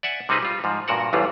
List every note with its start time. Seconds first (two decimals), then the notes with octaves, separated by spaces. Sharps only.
0.03 D5 E5 F#5 G#5
0.29 C3 G3 C4 D#4 G#4 B4
0.42 G3 F4
0.64 G#2 F3
0.88 G2 A#2 F#4 A#4 F#5
1.13 A1 E2 G2 E3 G3 F4